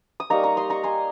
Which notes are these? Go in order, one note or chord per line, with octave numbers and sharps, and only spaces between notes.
D#6
G3 A#3 D#4 A#5 C#6
A#5 C#6
C6 D#6
A#5 C#6
G#5 C6